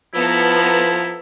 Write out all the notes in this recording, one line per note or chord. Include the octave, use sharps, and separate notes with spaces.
F3 B3 E4 A4 A#5